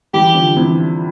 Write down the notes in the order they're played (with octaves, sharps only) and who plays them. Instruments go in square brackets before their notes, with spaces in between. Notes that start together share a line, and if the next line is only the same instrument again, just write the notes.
[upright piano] E3 G3 [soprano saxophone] G4
[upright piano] D3 F3
C3 E3